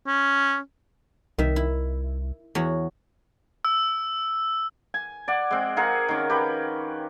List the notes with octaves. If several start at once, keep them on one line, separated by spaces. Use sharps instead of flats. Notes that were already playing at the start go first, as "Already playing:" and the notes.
C#4
C2 D#3 E5
E4
E2 F#4 C#5
E6
G#5
D5 F#5
G#3 C4
F4 G#4 A#4 F#5
D#3 C#4
G4 B4